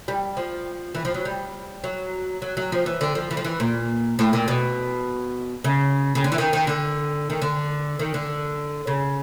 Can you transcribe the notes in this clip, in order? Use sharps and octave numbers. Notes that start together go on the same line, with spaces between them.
G3
F3
E3
F3
F#3
G3
F#3
F#3
F#3
F3
E3
D3
F3
E3
F3
E3
A#2
A2
A#2
B2
C#3
C#3
D3
E3
D#3
D#3
D3
D#3
D3
D#3
D3
C#3